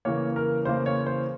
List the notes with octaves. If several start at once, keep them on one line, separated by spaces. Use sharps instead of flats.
C#3 E3 A#3 C#5
A#4
C#3 E3 A#3 C5
C#5
C5